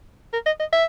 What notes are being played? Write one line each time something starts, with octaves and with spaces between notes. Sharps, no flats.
A#4
D#5
D#5
E5